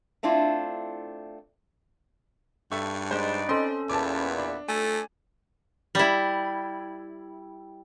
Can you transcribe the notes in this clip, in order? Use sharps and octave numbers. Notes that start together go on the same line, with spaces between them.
A3 C4 D4 E4 F4
G2 A4 E5 C#6
G#3 D#4 B4 C5 D5
C4 C#4 A4 D#5 C6
E2 A#2 B3 E5 A5 D6
D4
A3 A4 G#5
G3 E4